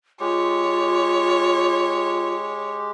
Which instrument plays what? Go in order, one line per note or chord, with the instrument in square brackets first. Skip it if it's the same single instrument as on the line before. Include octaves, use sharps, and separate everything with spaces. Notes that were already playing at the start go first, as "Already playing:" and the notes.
[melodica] G#3 G4 [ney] F4 [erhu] C#5